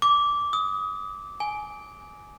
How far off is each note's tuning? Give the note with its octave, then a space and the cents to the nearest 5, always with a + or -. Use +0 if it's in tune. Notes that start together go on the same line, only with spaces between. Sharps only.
D6 -15
D#6 +25
G#5 +15